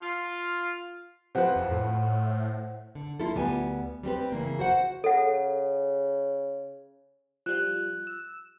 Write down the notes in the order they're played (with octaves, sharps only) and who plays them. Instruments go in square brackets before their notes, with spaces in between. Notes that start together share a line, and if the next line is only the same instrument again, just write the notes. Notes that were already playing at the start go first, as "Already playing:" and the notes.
[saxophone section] F4
[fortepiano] C3 F3 B4 [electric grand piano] C5 F#5
[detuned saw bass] F2
A2
[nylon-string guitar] D3
A#3 E4 F4 A4
D2 G3 B3 G#5
G3 C4 G4 B4
C#3 E3 A#3
F#4 C5 F#5
[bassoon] C#3 [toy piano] A4 F#5
[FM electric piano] F3 G3 [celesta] F#6
[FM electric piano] E6